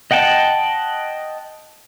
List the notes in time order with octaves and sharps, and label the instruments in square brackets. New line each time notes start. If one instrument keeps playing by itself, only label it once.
[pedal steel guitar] D#5 F#5 G5 A5